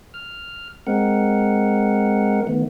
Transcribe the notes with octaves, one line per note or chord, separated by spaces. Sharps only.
F6
G#3 C4 A#4 F#5
D#3 A3 B3